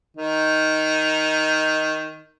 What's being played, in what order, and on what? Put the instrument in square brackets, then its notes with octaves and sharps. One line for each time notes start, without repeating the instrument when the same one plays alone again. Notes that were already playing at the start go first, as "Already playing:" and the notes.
[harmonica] D#3 D#4